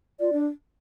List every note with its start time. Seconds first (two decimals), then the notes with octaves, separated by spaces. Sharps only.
0.20 F4 D5
0.33 D4